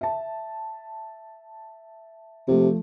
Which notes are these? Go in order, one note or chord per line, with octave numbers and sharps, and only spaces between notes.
E5 A5
C3 F3 A3